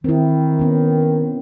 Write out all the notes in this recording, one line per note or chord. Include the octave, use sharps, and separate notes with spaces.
D#3 C4 E4
B3 C#4